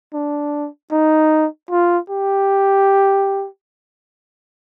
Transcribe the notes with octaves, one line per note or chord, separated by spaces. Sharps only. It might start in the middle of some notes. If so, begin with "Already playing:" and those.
D4
D#4
F4
G4